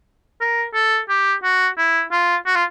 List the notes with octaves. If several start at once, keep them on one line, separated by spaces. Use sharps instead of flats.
A#4
A4
G4
F#4
E4
F4
F#4
F4